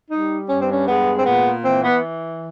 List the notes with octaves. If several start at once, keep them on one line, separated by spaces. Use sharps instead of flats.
G3 D#4
G2 C#4
C4
C#4
G#3 B3
C4
A#2 B3
E3 C4
B3